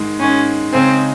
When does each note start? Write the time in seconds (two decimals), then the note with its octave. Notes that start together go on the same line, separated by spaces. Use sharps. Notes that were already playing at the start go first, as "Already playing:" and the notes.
Already playing: G#2 D#3 G#3
0.19 G#2 D#3 G#3 C#4
0.73 C#3 G#3 C4 D#4 G#4